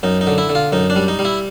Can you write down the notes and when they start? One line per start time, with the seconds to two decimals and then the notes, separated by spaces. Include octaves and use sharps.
0.03 F#2 D#4
0.21 D#4
0.27 D3
0.38 E4
0.49 D3
0.55 F4
0.72 F#2 D#4
0.90 D4
0.96 G3
1.08 D#4
1.19 G3
1.25 E4